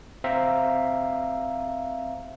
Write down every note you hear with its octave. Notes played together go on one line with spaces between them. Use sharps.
C4 C5 E5 F5 A#5